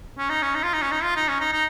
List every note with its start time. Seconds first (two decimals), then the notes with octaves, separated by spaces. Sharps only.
0.18 C#4
0.30 D#4
0.42 C#4
0.55 D#4
0.64 F4
0.74 D#4
0.82 C#4
0.92 D#4
1.03 F4
1.16 D#4
1.28 C#4
1.40 D#4
1.53 D#4